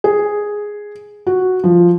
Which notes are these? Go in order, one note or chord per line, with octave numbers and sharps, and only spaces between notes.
G#4
F#4
F3